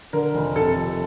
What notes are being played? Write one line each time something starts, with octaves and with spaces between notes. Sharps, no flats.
D3 A#4
F1
C3 A4
F2